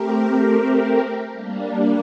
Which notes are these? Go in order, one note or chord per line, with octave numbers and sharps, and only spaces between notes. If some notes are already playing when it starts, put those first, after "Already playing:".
Already playing: A3 C4 G4 A#4
G3 A#3 D4